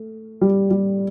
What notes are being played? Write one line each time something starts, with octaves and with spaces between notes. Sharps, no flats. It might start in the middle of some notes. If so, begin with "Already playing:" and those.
Already playing: A3
G3
G3